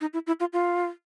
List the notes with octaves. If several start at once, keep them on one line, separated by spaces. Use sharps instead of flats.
D#4
E4
E4
F4
F4